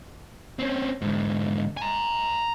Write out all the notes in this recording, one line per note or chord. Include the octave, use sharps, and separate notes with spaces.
C4 C#4
G#2 D3
G#5 A#5